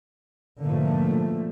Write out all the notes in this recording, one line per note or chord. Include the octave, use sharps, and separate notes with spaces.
G#2 B2 D3 F3 A3 A#3